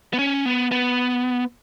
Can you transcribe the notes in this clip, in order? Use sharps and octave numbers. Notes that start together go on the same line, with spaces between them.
B3
C#4
B3
B3